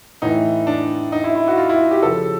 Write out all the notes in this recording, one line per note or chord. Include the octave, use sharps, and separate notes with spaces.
A2 E3 D#4
D4
D#4
E4
E4
F#4
F4
E4
G4
C#3 F3 A4